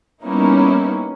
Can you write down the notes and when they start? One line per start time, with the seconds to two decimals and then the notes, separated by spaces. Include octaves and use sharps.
0.24 G3 A#3 B3 C#4 D#4 E4